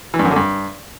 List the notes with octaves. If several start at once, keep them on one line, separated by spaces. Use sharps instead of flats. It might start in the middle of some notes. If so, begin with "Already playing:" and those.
E3
G2
F#2
D3
G2